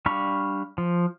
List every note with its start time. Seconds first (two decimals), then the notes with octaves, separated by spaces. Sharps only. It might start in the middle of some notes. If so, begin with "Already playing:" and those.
0.06 G3 D4 F5 B5 C#6
0.78 F3